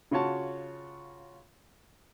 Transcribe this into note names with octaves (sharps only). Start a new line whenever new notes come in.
C#3 F4 F#4 C#5 A5